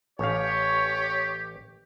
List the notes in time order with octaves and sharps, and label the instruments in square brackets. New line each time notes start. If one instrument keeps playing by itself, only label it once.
[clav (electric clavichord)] A1 F5 [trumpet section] G4 [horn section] C#5